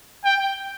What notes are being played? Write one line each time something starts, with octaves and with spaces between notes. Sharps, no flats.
G5